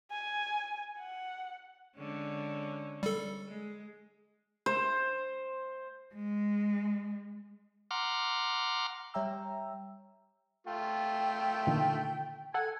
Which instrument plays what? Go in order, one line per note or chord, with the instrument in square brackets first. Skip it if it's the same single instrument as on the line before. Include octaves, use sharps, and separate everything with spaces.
[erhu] G#5
F#5
[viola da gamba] D3 G#3 C#4
[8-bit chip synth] G3 A4
[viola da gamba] G#3
[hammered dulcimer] C5
[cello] G#3
[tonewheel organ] F#5 A#5 C6 D6 F6
[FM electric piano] G3 C#5 E5 G5 A#5 E6
[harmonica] A3 F4 [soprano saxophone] G5
[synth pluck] A#2 D3 D#3
[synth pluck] A4 F#5 [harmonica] G#5